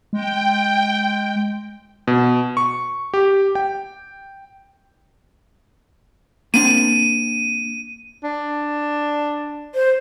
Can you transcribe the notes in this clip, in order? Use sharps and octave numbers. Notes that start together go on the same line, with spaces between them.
G#3 G5
B2
C#6
G4
G5
A#3 C4 D4 D#7
D4
C5